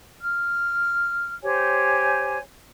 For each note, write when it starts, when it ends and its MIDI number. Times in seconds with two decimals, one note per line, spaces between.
0.20 1.32 89
1.43 2.37 67
1.43 2.37 72
1.43 2.37 73
1.43 2.37 80